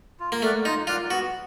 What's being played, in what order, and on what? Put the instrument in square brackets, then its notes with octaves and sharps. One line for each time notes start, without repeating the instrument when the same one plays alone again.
[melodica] F4
[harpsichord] A#3
[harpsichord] A3 [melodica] A#4 D5 F#5
[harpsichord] D#4 [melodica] F4
[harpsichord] F4 [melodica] A#4 D5 F#5
[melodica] B3 [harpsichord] F#4